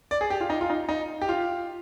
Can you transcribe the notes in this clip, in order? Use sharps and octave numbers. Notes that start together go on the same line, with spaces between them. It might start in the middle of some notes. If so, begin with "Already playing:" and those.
D5
G#4
G4
F4
D#4
F4
D#4
D#4
G4
F4